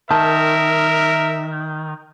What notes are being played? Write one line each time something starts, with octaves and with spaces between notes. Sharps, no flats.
D#3 A#4 E5 A5